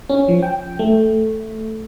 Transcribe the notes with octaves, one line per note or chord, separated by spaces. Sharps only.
C#4
F3
G5
A3